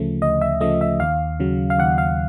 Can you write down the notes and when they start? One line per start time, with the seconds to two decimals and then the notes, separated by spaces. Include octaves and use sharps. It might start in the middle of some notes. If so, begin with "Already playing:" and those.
Already playing: D2 C#3 F3 A3
0.22 D2 D#5
0.41 E5
0.61 C#3 F3 A3 D#5
0.81 E5
1.00 D#2 F5
1.40 C#3 F#3
1.70 F5
1.78 D#2 F#5
1.98 F5